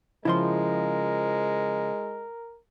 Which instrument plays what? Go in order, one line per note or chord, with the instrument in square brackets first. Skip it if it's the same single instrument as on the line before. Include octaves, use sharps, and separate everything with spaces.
[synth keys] C#3 F3 [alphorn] G#3 [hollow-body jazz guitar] E4 D#5 C6 [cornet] A#4